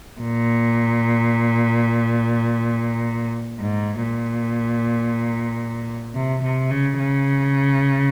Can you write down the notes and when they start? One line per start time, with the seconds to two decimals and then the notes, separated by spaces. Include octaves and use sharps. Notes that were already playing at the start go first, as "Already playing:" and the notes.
0.21 A#2
3.61 G#2
4.02 A#2
6.15 C3
6.43 C3
6.71 C#3
6.99 C#3